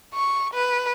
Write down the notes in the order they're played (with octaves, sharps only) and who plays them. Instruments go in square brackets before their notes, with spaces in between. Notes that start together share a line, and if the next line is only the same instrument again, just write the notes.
[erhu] C#6
B4